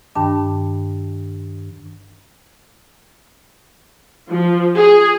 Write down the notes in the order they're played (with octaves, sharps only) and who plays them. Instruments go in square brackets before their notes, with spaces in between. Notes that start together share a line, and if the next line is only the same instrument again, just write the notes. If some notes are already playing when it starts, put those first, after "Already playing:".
[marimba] G2 D#3 D4 G5 A5 D6
[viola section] F3
G#4